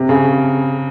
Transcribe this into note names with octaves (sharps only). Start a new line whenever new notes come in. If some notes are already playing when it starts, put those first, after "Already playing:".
Already playing: C3
C#3